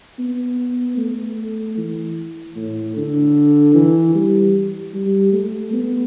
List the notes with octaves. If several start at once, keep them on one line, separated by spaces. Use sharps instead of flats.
B3
A3
E3
A2
D3
E3
G3
G3
A3
B3